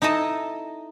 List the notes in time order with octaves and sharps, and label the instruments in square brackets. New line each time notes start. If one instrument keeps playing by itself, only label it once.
[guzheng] D#4 E4 A4 D#5 A5